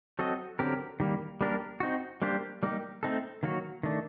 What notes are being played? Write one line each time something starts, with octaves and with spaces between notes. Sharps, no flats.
F#3 C4 F#4 A4 D#5
D3 F#3 C4 G4 A#4
D#3 G3 A#3
G3 A#3 D4 G4 A#4
C4 D#4 F#4
G3 A#3 D4 G4 C5
G3 A#3 D#4 G4
A3 C4 D#4 A4
D#3 F#3 A#3 F#4
D#3 A3 D4